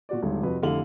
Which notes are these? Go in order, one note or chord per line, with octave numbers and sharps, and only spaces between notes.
A#2 F#4 D5
D#1 G#1 D3
F2 C3 F#4 B4
F1 D3 E4 F5 F#7